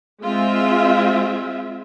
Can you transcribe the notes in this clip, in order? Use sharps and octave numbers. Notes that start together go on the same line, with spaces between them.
G#3 C4 F4 E5